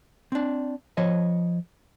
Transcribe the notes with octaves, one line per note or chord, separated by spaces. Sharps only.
C4 D4
F3 C#5 D#5